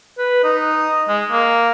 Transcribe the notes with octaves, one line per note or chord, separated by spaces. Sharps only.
B4
D#4
G#3
A#3